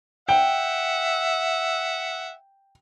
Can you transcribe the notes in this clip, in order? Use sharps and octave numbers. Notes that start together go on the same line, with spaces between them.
E5 F#5 G5